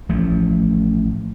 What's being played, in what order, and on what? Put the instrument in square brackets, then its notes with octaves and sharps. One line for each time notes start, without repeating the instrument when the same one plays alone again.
[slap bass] A1 F3 A3